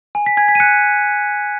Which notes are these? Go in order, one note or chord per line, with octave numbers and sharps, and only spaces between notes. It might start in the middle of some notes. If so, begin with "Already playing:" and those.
G#5
B6
G#5 G#6
B6
D#7
F#6 C#7